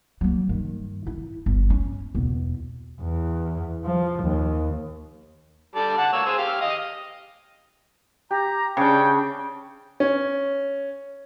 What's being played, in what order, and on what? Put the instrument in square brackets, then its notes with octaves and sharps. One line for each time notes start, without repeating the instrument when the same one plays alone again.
[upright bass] F#3 A#3
G2 D#3
E4
G1
C#4
E2 B2
[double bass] E2
F3
D#2
[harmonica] G3 A4 D5
F#5 A5
A#3 C#5 E6
G#4 C5 E6
G4 F5 F6
D#5 F5 D#6
[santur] G4 [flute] A#5
[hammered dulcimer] C#3 [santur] D4 C#6 [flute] G5
[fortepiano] C#4